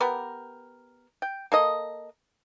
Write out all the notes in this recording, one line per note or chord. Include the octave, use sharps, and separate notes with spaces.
B3 G4 A#4
G5
A#3 A4 D#5